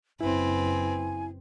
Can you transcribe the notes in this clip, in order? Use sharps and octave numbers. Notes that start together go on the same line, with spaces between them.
F#1 C4 E4 B4 G#5